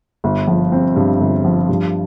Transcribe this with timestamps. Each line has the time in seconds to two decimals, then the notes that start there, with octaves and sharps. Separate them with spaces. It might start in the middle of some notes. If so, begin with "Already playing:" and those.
0.24 G1
0.47 F3
0.72 C4
0.96 G2
1.20 G1
1.45 F3
1.69 G2